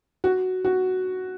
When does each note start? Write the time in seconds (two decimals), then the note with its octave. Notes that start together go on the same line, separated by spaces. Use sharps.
0.24 F#4
0.65 F#4